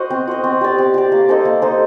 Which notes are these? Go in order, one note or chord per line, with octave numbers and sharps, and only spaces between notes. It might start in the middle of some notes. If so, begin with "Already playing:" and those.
Already playing: F#4 C5 D#5
C4
F#4 C5 D#5
C4
G4 D5
C4
G4 D5
A#3
D#4 A4 C5
A#3
D#4 A4 C5